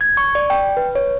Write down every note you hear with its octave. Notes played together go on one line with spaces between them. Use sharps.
G#6
C#6
D5
G5
B4
C#5